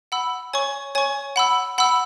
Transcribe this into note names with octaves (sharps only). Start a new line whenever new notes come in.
F#5 B5 E6
C#5 G#5 C#6
C#5 G#5 C#6
F#5 B5 E6
F#5 B5 E6